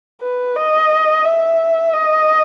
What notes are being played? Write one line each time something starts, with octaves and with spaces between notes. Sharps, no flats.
B4
D#5
E5
D#5